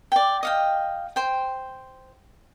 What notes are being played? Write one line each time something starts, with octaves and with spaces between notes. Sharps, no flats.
D5 G5
D#5 F5 G5
C5 G5